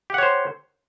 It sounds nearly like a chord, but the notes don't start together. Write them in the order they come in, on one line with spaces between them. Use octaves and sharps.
G4 F#5 C#5 C5